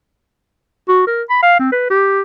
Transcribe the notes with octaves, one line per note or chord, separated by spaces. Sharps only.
F#4
A#4
B5
F5
C4
B4
G4